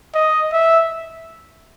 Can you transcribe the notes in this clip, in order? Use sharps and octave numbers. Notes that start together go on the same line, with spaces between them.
D#5
E5